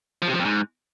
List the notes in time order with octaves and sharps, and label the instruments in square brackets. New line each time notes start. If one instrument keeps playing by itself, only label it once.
[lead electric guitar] F3
C3
F3
F2
G#2